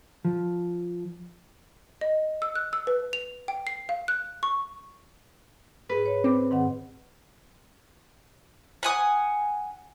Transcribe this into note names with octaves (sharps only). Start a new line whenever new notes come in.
F3
D#5
E6
F#6
E6
B4
F7
G5
C7
F5
F#6
C#6
G#2 G#4 B4
C#5
C4 B5 D6
G#2 D#3 F#5
F#5 G#5 D#6